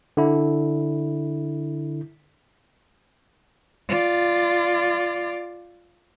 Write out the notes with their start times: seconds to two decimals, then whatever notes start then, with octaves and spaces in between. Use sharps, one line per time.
0.17 D3 E4
3.89 F4 D5